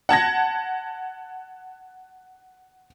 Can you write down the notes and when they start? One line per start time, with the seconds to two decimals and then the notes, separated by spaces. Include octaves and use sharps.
0.09 F#5 A5 G#6 A#6